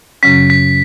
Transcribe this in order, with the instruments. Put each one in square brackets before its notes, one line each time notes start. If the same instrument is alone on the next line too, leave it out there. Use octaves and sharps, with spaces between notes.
[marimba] F#2 C#3 F#3 C#4 [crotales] B6
[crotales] B6